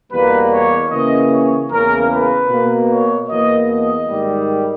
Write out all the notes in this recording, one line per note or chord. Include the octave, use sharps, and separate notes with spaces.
E2 B2 G3 A#3 B4
C#5
C#3 E3 A#3 D#5
C#5
E2 C#3 E3 A#3 A#4
B4
B2 A#3
C#5
E2 B2 A#3 D#5
D#5
G#2 D#3 G3